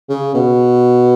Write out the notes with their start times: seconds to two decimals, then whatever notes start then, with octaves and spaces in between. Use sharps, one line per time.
0.09 C#3
0.34 B2